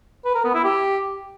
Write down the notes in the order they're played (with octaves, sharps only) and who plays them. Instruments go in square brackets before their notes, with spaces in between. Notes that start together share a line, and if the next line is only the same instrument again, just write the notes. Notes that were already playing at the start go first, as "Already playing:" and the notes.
[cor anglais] B4
A#4
B3
E4
G4